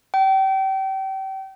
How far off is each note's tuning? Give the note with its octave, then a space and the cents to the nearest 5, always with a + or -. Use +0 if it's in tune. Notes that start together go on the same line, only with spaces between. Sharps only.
G5 -30